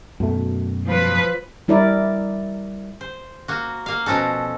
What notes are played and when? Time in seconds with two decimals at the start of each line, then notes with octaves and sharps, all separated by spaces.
0.20 F#2 B2 A3
0.88 F3 B4
1.68 G3 E4 A#4 D5
3.01 C5
3.48 A#3 F#4
3.86 A#3 F5
4.06 B2 F3 C#4 F#4 A4